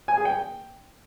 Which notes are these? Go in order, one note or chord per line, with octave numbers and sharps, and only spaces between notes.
G#5
G#4
G5